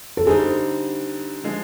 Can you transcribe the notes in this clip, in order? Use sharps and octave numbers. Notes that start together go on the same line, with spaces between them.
A4
D3 G3 C4 D#4 G#4
D3 F3 G#3